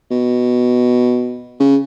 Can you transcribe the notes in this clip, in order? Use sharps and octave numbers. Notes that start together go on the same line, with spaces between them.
B2
C#3